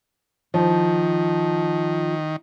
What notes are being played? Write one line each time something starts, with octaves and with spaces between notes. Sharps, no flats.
D#3 F3